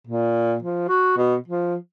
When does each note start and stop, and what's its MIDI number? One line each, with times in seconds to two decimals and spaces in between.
0.07 0.56 46
0.63 0.84 53
0.89 1.16 66
1.17 1.36 47
1.48 1.75 53